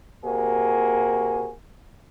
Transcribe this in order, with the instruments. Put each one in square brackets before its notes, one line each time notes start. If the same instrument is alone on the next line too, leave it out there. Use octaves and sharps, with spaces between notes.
[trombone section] C3 A#3 F#4 G#4